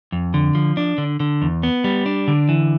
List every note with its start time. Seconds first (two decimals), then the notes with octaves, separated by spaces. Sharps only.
0.12 F2
0.34 D3
0.55 F3
0.77 D4
0.98 D3
1.20 D3
1.42 E2
1.63 B3
1.84 G3
2.06 D4
2.28 D3
2.49 E3